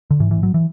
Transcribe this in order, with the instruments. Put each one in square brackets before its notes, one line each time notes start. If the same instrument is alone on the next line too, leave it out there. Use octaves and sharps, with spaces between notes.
[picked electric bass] D3
G#2 E3
A1 E3
F#3
E3